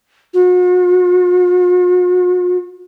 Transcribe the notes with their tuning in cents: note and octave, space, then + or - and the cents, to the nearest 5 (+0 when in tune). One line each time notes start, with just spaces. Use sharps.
F#4 -45